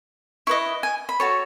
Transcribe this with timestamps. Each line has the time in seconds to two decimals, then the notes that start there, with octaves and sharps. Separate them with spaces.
0.47 E4 B4 D#5 C#6
0.83 G#5
1.09 B5
1.20 F#4 A4 C#5 C#6